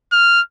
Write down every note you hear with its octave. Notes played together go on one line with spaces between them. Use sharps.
F6